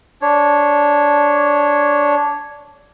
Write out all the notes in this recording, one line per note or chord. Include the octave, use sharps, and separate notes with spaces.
D4 C#5